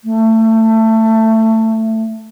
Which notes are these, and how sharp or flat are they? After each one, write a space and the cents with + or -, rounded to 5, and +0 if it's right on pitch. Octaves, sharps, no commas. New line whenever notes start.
A3 +20